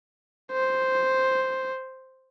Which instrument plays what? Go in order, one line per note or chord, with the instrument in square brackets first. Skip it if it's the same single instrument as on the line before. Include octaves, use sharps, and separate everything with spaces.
[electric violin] C5